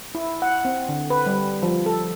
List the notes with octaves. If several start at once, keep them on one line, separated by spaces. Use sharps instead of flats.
E4
F#5
C4
D3
B4
G3
F3
A4